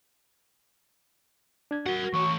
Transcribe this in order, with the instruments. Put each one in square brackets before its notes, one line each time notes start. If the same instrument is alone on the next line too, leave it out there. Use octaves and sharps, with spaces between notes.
[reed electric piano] D4 G#6
[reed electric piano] F#4 [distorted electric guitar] A#4 F#5
[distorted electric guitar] E3 C#5 [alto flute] C#6